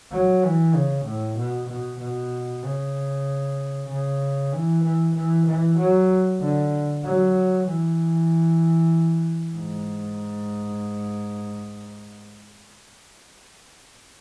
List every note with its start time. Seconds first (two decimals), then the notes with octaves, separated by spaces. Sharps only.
0.11 F#3
0.43 E3
0.74 C#3
1.05 A2
1.37 B2
1.69 B2
1.99 B2
2.63 C#3
3.88 C#3
4.52 E3
4.84 E3
5.15 E3
5.46 E3
5.78 F#3
6.40 D3
7.03 F#3
7.66 E3
9.55 G#2